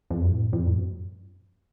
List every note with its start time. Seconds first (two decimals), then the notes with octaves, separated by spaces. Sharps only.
0.10 F2
0.21 F#2
0.31 A2
0.53 F2
0.67 A2
0.73 F#2